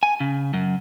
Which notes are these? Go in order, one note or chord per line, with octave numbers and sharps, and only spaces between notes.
G#5
C#3
F#2